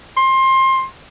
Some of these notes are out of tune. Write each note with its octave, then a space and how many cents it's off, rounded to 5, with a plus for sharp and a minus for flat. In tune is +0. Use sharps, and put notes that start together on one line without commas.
C6 +25